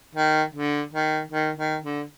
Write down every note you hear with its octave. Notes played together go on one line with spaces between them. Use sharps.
D#3
D3
D#3
D#3
D#3
D3